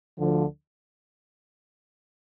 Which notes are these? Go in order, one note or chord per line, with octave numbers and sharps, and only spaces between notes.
D2 D3 F3